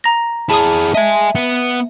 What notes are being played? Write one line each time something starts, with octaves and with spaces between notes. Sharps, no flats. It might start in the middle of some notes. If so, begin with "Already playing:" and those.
A#5 A#6
E4 G#4 A5 D#6
D#5 E5 G#5
B3